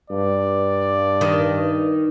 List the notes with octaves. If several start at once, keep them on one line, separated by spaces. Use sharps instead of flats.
G2 D5
D#3